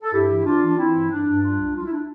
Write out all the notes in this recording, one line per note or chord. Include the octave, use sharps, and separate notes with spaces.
A4
G2 E4 G4
E3
E3 D4 F4
E3
D4
E3 C4 E4
G2
G2 D4
G2
G3 D4 F4
C2
C2 F4
E4
D4